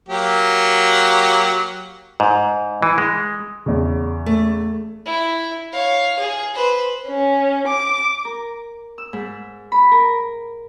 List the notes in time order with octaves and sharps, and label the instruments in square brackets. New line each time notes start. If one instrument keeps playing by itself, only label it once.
[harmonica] F#3 A#3 G4
[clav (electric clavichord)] G#2
E3
G#3
[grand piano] E2 C#3
[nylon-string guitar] A3
[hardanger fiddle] E4
C#5 F5
G#4
B4 C5
[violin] C#4
D6
[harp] A#4
E6
G#2
B5
A#4